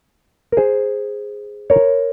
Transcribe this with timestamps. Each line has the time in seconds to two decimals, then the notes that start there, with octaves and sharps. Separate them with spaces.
0.52 A#4
0.57 G#4 C5
1.70 A#4 C#5